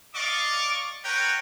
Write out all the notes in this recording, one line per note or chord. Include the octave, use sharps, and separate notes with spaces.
D5 D#5 F5 C#6 D6
A#4 B4 C#5 F#5 G5 A#5